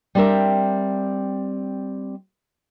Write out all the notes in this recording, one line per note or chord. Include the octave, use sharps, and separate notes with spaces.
G3 C4 D4 A#4 E5